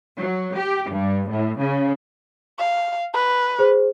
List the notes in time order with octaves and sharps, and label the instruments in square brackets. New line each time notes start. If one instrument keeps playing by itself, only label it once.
[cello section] F#3
G4
G2
A2
C#3
[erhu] F5
B4
[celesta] G#4 C5